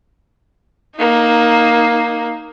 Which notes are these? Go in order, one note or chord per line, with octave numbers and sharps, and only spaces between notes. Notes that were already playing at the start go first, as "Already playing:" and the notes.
A#3 D#4